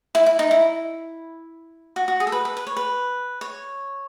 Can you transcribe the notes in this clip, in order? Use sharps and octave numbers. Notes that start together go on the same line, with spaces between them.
E4
E4
D#4
E4
F#4
F#4
G#4
A4
B4
B4
B4
C#5
B4
C#5